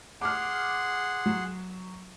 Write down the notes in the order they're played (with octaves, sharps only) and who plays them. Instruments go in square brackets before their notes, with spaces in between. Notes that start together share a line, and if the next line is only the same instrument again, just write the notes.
[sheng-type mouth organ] G#4 F#5 C6 [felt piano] D6 F6
[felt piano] F#3